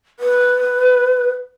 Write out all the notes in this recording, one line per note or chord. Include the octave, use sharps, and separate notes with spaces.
B4